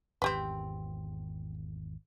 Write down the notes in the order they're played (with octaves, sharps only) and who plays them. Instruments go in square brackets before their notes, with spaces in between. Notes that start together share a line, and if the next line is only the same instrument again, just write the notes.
[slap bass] G#1 E2 [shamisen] C4 G4 B4